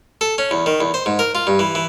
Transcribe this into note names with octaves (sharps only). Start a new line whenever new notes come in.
A4
C#4
E2
D#3
E2
C5
G#2
A#4
F4
G2
E3
E3